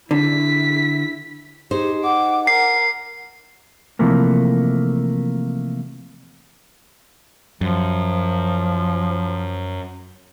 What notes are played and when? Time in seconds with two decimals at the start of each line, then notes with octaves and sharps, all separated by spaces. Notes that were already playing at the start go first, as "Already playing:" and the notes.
0.11 D3 E4 B6
1.71 D#4 G4 G#4 C5
2.04 F#5 D6
2.47 A#4 C7
3.99 C3 E3 F3 A3 A#3
7.61 F#2 F3